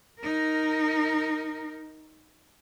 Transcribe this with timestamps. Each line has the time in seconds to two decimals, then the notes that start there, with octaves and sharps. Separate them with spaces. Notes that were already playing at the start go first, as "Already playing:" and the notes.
0.20 D#4 A#4